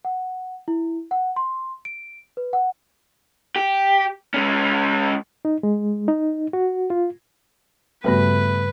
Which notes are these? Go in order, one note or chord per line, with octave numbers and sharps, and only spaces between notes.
F#5
E4
F#5
C6
D7
B4
F#5
G4
G#3 C#4
D#4
G#3
D#4
F#4
F4
G2 C#3 G3 A3 B3 F#4 B4